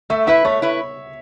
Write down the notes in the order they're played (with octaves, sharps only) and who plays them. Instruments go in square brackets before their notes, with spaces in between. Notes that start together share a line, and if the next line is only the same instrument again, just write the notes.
[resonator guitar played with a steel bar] A3 [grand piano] E5
[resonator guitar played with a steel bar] E4 B4 [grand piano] E5
[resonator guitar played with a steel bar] A3 [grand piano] C#5
[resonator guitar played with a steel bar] E4 B4